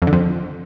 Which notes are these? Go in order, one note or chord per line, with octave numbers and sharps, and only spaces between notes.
F2
D3
F2